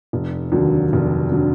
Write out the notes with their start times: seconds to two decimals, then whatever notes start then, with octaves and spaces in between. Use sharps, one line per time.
0.13 F1
0.52 D#2 D3 F#3
0.93 F1
1.32 D3 F#3